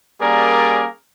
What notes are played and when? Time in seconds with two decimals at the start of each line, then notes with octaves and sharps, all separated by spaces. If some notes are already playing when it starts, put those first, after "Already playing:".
0.20 G3 A#3 C#4 G#4 A#4 D5